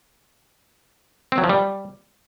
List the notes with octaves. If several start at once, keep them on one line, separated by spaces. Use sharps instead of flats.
C4
F#3
F3
G3